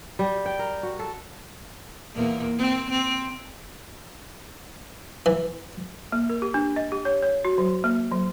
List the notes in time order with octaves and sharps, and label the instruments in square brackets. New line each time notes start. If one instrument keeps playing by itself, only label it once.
[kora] G3
G5
A#4
F#4
A4
[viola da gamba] E2 A#2 A#3
C4
C4
[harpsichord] E3
[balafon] A#3
A#4
G4
D4
D#5
G4
C#5
C#5
F#4
F#3
A#3
F#3